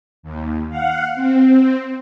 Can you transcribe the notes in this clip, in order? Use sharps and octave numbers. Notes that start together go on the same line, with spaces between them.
D#2
F5 F#5
C4